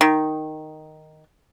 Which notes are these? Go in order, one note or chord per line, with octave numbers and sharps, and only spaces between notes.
D#3